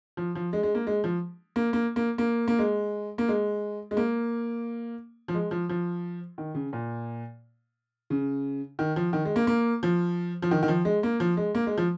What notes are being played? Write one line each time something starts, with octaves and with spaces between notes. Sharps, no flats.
F3
F3
G#3
G#3
A#3
G#3
F3
A#3
A#3
A#3
A#3
A#3
G#3
A#3
G#3
G#3
A#3
F3
G#3
F3
F3
D#3
C#3
A#2
C#3
D#3
F3
D#3
G#3
A#3
A#3
F3
F3
D#3
D#3
F3
G#3
A#3
F3
G#3
A#3
G#3
F3